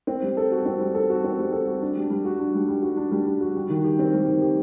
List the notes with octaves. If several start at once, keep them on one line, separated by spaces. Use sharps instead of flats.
C4
G3
A4
F#4
C4
G3
A4
F#4
C4
G3
A4
F#4
D4
G3
G3
F#4
D4
G3
G3
F#4
D4
G3
G3
F#4
G3
D#3
G4
C4
G3
D#3
G4